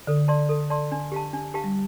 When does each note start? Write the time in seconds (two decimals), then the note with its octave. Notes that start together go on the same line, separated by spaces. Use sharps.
0.07 D3 A4
0.28 D5 A5 C6
0.49 A4
0.70 D5 A5 C6
0.92 D4
1.12 G4 F5 A5
1.33 D4
1.54 G4 F5 A5
1.64 G3